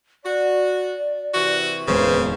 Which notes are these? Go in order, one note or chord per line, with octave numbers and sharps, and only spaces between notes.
F#4 D5
C3 E3 F#4
D1 E2 C#3 G#3 A#3 B4 C5